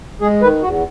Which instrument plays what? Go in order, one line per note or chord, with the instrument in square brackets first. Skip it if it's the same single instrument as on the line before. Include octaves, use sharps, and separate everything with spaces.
[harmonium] G#3 G#4
D#3 B4
E2 F#4